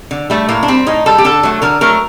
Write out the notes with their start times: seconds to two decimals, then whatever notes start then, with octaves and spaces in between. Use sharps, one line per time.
0.11 D3
0.30 G3 A3
0.48 A2 A#3
0.63 D4
0.68 G3 C4
0.86 A2 D#4
1.06 G3 A4
1.18 G4
1.24 D3 A4
1.43 F#3 A3
1.62 D3 A#4
1.81 F#3 A3 A#4